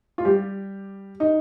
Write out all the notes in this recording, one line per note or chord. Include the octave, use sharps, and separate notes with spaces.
F4
G3 G4
D#4